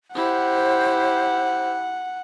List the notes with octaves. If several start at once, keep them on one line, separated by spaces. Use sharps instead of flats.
E4 G4 C5 F#5